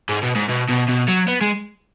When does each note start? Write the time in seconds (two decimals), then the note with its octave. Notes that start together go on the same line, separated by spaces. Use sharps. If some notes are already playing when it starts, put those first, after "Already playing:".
0.09 G#2
0.22 B2
0.35 G#2
0.49 B2
0.69 B2
0.88 B2
1.08 F#3
1.28 B3
1.41 G#3